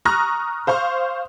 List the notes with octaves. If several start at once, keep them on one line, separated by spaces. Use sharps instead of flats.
A#5 C#6 D#6 F6 F#6 A#6
C5 F5 C6 C#6